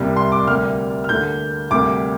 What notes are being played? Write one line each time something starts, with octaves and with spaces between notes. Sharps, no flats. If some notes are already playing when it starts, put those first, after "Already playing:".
Already playing: C2 C3 G3 A#3
C6
D6
D2 C3 G3 A#3 F6
F6
D2 D3 A#3 G6
D2 C3 G3 A#3 D6